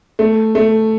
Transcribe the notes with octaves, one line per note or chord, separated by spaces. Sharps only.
A3
A3